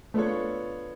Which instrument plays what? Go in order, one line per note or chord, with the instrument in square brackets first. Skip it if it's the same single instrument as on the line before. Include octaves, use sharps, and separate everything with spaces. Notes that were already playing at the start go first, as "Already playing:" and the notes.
[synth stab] A3 [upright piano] B3 D4 F4 A4 C#5